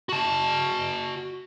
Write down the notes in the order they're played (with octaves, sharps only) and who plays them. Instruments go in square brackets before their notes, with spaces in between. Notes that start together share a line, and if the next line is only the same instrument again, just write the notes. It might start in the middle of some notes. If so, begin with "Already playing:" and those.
[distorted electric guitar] F#4 A5